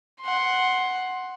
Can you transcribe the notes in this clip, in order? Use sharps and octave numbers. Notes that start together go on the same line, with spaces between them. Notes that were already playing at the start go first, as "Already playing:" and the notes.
F#5 C6